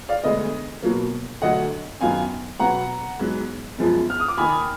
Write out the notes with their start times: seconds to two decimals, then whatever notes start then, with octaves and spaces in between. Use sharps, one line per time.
0.09 D5 F5
0.24 D2 D3 G#3 B3 D#5
0.83 B2 F#3 A#3
1.42 D2 D3 F#3 D#5 F#5
2.01 F#2 D#3 F#3 B3 F5 G#5
2.60 B2 F#3 B3 F#5 A#5
3.20 G#2 F#3 B3
3.78 F#2 F3 G#3 B3
4.10 F6
4.20 D#6
4.28 D6
4.37 D#2 D#3 A#3 G#5 B5